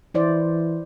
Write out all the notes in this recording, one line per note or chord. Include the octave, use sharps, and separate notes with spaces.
E3 E4 C5 D5